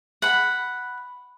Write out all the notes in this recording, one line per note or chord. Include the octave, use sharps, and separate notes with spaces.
F#5 B5